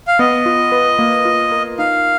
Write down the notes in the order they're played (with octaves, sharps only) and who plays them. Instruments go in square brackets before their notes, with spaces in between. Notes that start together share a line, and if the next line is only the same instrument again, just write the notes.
[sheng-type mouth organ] F5
[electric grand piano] B3 [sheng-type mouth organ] D#5
[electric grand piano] F4
B4
A#3
F4
A#4
[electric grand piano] D#4 [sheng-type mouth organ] F5